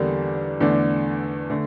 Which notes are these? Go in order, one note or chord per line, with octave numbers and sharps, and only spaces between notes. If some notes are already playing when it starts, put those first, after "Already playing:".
Already playing: E2 D3 G3 A#3 D4
E2 D3 A3 D4
D3 A3